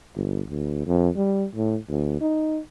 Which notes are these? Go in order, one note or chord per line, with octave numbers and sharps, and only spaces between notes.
G1
D2
F2
G3
A2
D2
D#4